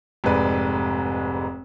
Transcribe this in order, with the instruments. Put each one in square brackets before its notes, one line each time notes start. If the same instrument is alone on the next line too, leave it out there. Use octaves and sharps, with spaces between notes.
[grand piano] F1 G#2 B4 D5